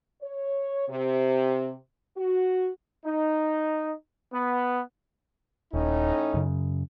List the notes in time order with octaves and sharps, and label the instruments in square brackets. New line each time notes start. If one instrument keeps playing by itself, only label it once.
[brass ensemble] C#5
C3
F#4
[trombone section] D#4
B3
[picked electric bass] D#1 [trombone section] A2 C#4 D#4
[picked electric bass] F#2 C#3